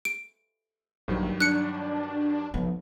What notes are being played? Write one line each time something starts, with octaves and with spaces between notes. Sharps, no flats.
D7
A#1 G2 D#3 F#3
D4 F#6 C#7
B1 F3 B3